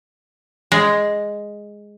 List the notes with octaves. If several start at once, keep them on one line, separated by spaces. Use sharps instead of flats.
G#3